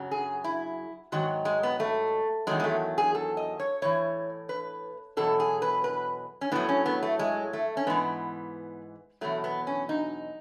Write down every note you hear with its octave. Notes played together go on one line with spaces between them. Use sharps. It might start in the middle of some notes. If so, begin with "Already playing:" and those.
Already playing: F#2 C#3 F#3
G#4
E4
G#2 D#3 F#3 F#4
G#3
B3
A3
E2 D#3 F#3 G#3
G#3
A3
G#4
A4
D#5
C#5
A2 E3 C#5
B4
E2 B2 F#3 A4
G#4
B4
B4
C#4
A2 F#3 B3
C#4
B3
A3
G#3
A3
C#4
G#2 E3 B3
E2 B2 F#3 A3
B3
C#4
D#4